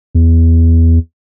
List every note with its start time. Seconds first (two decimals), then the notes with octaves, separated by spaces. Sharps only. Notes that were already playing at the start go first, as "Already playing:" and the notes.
0.15 E2